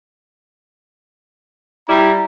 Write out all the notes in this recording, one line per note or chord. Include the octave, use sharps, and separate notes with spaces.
G3 E4 A#5